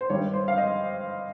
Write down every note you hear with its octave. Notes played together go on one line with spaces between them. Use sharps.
C5
G2 D#3 G3 C#5
C5
F5
D#5